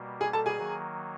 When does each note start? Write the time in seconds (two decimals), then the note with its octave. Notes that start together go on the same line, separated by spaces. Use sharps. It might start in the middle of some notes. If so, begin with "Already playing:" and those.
Already playing: B2 G3 A#3
0.21 G#4 G#5
0.33 A4 A5
0.46 G#4 G#5
0.58 D#3 F#3 A#3